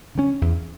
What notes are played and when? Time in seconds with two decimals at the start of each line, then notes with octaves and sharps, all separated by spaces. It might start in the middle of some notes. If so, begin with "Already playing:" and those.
0.15 C#3 G3 C#4
0.41 E2